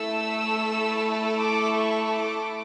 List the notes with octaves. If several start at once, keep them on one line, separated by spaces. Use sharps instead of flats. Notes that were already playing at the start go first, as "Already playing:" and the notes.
Already playing: A3 E4 A4 E6
D6
C#6
D6